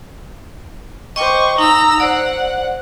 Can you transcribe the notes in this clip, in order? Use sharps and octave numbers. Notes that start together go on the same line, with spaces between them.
C5 D#5 G5 C#6 D6
D#4 A#5 E6
C5 D5 F#5